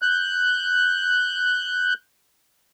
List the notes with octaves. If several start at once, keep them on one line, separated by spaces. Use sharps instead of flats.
F#6 G6